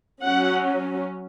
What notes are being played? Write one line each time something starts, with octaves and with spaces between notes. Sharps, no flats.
F#3 C#4 F#5